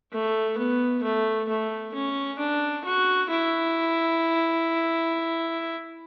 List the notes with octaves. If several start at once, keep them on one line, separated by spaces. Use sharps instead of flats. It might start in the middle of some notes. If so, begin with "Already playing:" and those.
A3
B3
A3
A3
C#4
D4
F#4
E4